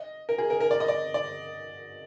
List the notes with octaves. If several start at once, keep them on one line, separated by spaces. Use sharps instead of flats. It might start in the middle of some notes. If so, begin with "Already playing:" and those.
Already playing: D#5
A#4
G#4
A#4
A#4
D5
D#5
D5
D5